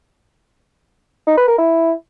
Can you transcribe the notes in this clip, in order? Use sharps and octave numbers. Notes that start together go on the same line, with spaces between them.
D#4
B4
A#4
E4